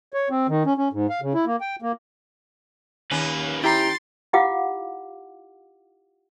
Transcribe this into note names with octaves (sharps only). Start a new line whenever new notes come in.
C#5
C4
D#3
C#4
C#4
G#2
F5
C#3
E4
A#3
G5
A#3
D#2 A#3 C#4 B4
E4 G4 G5 A#5 C6 A6
E4 F4 G4 F5 F#5 D6